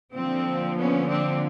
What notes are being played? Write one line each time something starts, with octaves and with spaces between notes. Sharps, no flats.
D3 F3 A#3 C4
B3 C#4
C4 D4